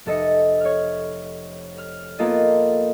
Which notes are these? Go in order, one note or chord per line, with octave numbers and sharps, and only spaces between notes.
F1 A4 D#5 C#7
C#5 F6
F6
A#3 B3 F4 A4 D#5